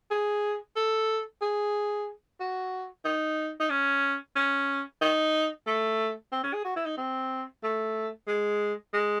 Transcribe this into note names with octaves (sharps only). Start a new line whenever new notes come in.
G#4
A4
G#4
F#4
D#4
D#4
C#4
C#4
D#4
A3
C4
C#4
G#4
F#4
E4
D#4
C4
A3
G#3
G#3